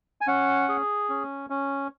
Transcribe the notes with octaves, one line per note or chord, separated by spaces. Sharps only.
G#5
C#4 F#5
G#4
C#4
C#4